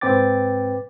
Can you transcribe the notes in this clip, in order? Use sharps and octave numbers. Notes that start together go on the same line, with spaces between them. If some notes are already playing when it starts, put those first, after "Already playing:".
G#2 C4 B4 G5 D6 A6